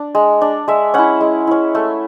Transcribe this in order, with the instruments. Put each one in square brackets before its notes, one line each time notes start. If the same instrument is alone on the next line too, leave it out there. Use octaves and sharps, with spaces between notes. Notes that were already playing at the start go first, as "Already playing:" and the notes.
Already playing: [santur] D4
G#3
D4
G#3 E5
C#4 E4 F#5
G#3
C#4 E4
A3